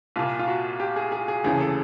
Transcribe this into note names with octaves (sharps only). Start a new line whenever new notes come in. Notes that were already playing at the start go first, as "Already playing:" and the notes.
C2 A#2 F4
F4
F#4
G4
G#4
G#4
G#4
F1 D#2 C#3 E3 G#4
A4